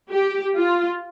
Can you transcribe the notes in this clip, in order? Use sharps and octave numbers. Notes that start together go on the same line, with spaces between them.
G4
F4